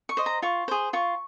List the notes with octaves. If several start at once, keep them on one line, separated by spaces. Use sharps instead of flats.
C#6
C5 D#5
A#5
F4 C#6
G#4 C5
F4 C#6